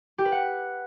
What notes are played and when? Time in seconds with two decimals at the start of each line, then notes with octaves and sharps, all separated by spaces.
0.18 G4
0.25 B4
0.32 F#5